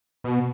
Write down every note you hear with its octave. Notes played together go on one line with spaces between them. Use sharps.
B2